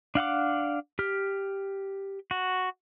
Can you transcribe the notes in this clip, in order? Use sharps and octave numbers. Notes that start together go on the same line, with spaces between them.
D4 F5 F#5 D6
G4 F6
F#4